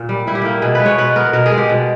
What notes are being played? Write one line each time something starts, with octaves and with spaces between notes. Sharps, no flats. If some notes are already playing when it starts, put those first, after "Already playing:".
Already playing: A#2 A#3
G3
A#2 E4
G4
A#3 E4
B2 G#4
G#3 B4
C#5
B2 B4
B3 A#4
B2 A#4
G#4
G#3
G4
B2